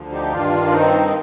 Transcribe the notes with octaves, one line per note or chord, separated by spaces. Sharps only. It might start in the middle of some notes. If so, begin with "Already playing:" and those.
Already playing: D2 D3 F3
D#4 G4
G2 D#3 D4 F4
C4 D#4